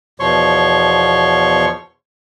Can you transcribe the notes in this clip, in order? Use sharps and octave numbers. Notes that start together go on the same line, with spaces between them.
E2 B2 F3 C#5 C6 C#6